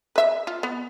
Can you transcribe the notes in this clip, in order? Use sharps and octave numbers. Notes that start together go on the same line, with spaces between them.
B4 E5
F4
B3